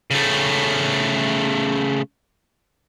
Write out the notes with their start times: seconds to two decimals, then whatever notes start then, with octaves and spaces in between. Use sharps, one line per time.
0.11 C#3 A3